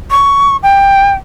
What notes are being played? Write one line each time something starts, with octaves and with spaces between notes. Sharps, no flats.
C#6
G5